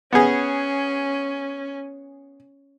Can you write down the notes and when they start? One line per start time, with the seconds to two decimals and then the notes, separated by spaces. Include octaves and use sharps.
0.13 B3 C#4 G#4